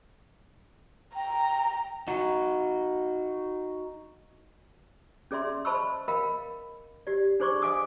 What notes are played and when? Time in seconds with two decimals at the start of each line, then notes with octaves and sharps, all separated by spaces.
1.15 G5 A#5
2.08 D#4 F#4
5.31 C#4 G#4 D5 E5 C6
5.65 C5 D#5 A5 B5 C#6 E6
6.08 A#4 D#5 F5 G5 B5
7.07 G4 D5
7.40 D4 G#4 C5 D5 C#6 D6
7.62 D#5 F5 G#5 D6 D#6